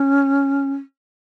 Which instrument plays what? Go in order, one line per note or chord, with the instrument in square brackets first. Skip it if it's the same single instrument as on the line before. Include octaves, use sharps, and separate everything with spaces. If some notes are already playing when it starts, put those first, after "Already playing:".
Already playing: [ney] C#4